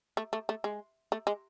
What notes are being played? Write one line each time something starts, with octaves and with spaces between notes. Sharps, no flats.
A3
A3
A3
G#3
A3
G#3